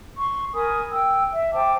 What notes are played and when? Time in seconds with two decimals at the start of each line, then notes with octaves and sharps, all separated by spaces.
0.18 C6 C#6
0.53 A#4 G#5 B5 D#6
0.91 G5 E6
1.33 E5
1.54 C5 G5 A5 D6